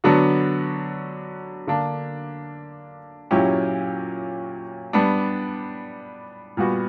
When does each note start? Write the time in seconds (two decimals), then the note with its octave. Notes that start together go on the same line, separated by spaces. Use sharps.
0.04 D3 F#3 B3 D4 F#4
1.67 D3 A#3 D4
3.31 A#2 F#3 C#4 E4 G4
4.93 G3 B3 D4
6.57 A#2 G3 B3 F#4